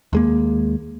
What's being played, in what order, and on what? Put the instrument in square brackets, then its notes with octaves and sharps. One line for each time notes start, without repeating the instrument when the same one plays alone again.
[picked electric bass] D#2 G#3 A#3